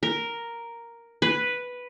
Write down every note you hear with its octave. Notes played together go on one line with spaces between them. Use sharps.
A#4
B4